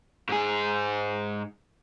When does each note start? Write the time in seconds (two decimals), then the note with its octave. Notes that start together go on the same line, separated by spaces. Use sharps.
0.29 G#2 G#4